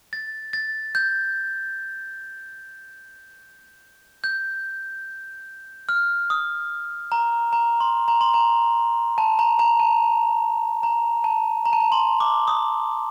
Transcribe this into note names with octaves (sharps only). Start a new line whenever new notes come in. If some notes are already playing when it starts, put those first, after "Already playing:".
A6
A6
G6
G6
F6
D#6
A#5
A#5
C6
A#5
C6
A#5
A5
A#5
A#5
A5
A#5
A5
A#5
A5
A#5
C6
D6
D#6